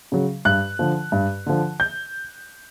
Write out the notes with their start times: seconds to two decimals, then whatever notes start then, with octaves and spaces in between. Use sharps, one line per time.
0.12 C#3 F#3
0.45 G2 F#6
0.79 D3 F3
1.12 G2
1.46 D3 F3
1.80 G6